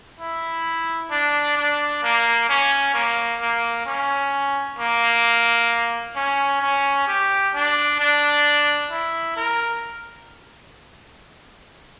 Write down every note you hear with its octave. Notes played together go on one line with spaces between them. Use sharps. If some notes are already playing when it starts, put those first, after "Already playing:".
E4
D4
D4
A#3
C#4
A#3
A#3
C#4
A#3
C#4
C#4
G4
D4
D4
E4
A#4